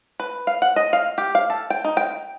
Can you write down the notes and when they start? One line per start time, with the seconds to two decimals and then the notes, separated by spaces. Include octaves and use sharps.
0.20 B4
0.47 F5
0.62 F#5
0.76 D#5
0.93 F5
1.18 G4
1.35 F5
1.50 A4
1.70 G5
1.84 D#4
1.97 G5